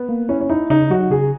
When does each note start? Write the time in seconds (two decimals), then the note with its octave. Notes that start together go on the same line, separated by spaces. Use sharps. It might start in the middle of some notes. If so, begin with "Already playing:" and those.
Already playing: B3
0.09 A#3
0.29 C#4 E4
0.41 C#4
0.49 D#4 E4
0.70 C#3 D#4
0.90 F#3 F#4
1.11 C#3 G#4